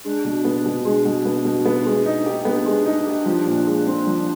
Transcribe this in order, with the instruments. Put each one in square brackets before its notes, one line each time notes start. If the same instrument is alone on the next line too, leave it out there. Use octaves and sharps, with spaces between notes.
[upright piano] G#3 [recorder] D4
[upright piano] B2
B3
B2
[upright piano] G#3 [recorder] D4
[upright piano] B2
B3
B2
B3
G#3
D#4
G4
[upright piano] B3 [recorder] D4
[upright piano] G#3
D#4
G4
F3
A#2
G#3
C4
F3